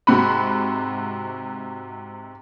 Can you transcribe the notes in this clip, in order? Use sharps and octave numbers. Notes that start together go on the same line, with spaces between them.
G#2 C3 F#4 B5